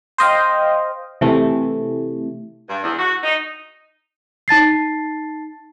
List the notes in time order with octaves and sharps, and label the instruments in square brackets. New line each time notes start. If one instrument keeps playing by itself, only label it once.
[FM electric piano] C5 D#5 F5 G5
C3 E3 A3
[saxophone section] G2
E2
F#4
D#4
[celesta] D#4 A5 A6 C7